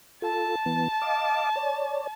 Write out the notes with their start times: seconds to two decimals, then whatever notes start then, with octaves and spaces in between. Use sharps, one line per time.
0.22 F4 A4 A5
0.66 E3 B3
1.02 D#5 F5 D6
1.56 C#5 D5